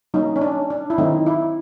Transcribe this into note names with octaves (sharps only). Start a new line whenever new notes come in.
F#3 A#3 C#4 D#4
C#4
D4
D4
E4
D#3 F#3 A3 C4 D#4
E4